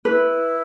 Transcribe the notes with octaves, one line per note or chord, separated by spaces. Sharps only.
E4 B4